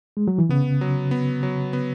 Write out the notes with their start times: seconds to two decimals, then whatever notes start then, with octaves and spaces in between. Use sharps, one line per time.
0.17 G#3
0.28 F#3
0.39 E3
0.49 C#3 B3
0.81 F#3
1.11 B3
1.43 F#3
1.73 B3